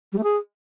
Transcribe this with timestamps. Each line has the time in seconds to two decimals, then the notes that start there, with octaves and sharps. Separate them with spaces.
0.12 G3
0.18 A3
0.23 G#4